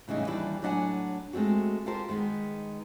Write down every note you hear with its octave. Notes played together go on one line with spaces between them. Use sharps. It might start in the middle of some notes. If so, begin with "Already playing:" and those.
A2 C#3 E3 G3 D#4
D#2 E3 G3 D4 E4 D5
A2 F#3 D4 D#5 F#5 G#5
G#3 A3 C4 F#4
F4 G4 A4 A#4 C5
D#3 G#3 B3